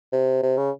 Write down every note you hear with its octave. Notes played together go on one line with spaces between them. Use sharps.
C3
C3
C#3